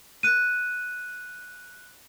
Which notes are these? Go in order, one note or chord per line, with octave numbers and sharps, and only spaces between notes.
F#6 D#7